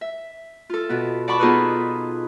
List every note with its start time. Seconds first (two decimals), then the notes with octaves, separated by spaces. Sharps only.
0.01 E5
0.70 F4 A4
0.89 B2 B3
1.28 D5 F#5 A5 B5 C#6
1.39 B3 D#4 F4 G#4 A4 B4